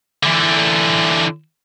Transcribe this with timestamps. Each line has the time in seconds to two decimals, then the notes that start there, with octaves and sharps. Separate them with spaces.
0.23 D3 E3